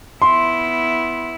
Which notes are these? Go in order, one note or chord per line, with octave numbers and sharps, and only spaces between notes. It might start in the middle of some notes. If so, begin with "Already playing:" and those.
B3 E4 C6